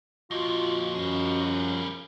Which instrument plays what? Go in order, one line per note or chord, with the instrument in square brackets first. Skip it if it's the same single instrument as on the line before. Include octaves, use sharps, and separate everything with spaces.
[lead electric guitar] F2 A#2 [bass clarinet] F4 [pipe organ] F#4 D#5
[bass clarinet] F#2 [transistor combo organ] F3 C#4 [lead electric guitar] G3 G#4